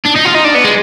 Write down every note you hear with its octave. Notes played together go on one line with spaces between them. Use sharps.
D4
D#4
F4
D#4
D4
B3
G#3